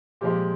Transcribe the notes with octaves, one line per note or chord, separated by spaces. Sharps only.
A#2 F3 G#3 G4